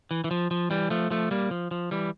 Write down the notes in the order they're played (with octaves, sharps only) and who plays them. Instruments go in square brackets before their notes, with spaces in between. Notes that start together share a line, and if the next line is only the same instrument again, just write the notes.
[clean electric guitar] E3
E3
F3
F3
E3 G3
F3 A3
F3 A3
G3 A#3
F3
F3
E3 G3